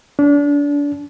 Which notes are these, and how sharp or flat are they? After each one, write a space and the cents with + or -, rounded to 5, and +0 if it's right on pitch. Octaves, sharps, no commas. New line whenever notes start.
D4 -30